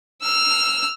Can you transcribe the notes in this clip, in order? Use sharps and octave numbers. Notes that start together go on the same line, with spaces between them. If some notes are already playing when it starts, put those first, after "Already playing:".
E6 F6